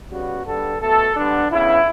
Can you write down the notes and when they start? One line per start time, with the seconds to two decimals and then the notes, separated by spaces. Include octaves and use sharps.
0.11 C#3 G3 B3 F#4
0.46 D3 G3 B3 A4
0.81 B2 A3 A4
1.16 D3 G3 B3 D4
1.51 C#3 E3 B3 E4